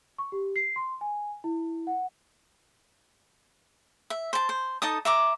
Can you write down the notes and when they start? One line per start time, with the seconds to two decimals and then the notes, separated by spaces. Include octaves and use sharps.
0.18 C#6
0.32 G4
0.56 C7
0.76 C6
1.01 G#5
1.44 E4
1.87 F#5
4.10 E5
4.33 C5 A5
4.49 C5
4.82 D#4 A4 A5 D#6
5.05 E5 A#5 D6